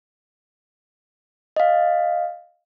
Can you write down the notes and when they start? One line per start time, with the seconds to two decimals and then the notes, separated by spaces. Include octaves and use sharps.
1.56 D#5 F5